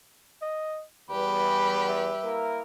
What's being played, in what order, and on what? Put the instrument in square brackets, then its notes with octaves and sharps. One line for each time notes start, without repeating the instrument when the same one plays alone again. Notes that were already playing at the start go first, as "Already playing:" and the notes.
[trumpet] D#5
[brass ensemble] E2 [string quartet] G3 G4 B4 [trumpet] B5
[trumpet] E5
[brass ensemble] A#3 E4 A#4